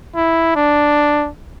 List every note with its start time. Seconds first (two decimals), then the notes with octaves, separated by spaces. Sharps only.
0.16 E4
0.56 D4